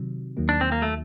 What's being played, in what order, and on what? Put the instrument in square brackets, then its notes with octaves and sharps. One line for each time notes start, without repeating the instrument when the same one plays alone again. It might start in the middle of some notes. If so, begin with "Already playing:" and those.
Already playing: [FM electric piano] C3 D#3 F#3
D#2 D#3 F#3 A#3
[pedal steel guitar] D4
C4
A#3
A3